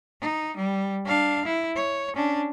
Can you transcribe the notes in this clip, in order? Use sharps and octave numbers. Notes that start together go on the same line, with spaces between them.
D#4
G3
D4 F5
E4
C#5
C#4 D4